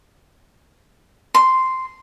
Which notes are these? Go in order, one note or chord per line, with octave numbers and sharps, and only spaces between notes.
C6